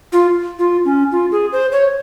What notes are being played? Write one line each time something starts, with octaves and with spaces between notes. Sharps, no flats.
F4
F4
C#4
F4
G#4
C5
C#5